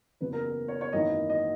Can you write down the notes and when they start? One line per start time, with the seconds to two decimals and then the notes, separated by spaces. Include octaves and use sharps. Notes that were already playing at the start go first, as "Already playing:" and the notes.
0.21 F#1 E2 C#3 F#3 B3 B4
0.33 A#4
0.45 A#4
0.68 C#5
0.81 C#5
0.93 G#1 F#2 E3 A#3 D#5
1.30 D#5